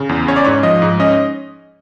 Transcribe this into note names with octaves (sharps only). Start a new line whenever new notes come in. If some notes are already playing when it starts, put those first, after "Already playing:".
Already playing: C#3
E2
C#4 C#5
D5
G#2 C#5
F3 D#5
G#2
C#4 D#5